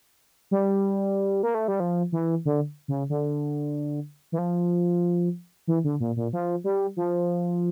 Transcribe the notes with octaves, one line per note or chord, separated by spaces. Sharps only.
G3
A#3
A3
G3
F3
E3
D3
C#3
D3
E3
F3
E3
D3
A#2
A#2
F3
G3
F3